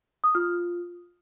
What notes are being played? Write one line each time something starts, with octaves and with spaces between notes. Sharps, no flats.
D#6
F4 F6